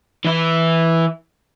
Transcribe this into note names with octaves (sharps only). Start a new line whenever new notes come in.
E3 E4